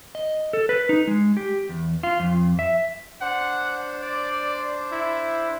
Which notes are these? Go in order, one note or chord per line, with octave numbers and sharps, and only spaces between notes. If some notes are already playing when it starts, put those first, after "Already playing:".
D#5
A4
B4
D#4
G#3
G4
E2
F4
F2
E5
D4 C5 F#5
D5
E4